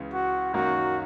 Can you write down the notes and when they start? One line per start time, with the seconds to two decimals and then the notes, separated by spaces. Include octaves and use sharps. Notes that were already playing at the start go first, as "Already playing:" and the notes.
Already playing: C#2 C#3 E3
0.13 F#4
0.53 F#2 D#3 F#3 A#3 D#4 F#4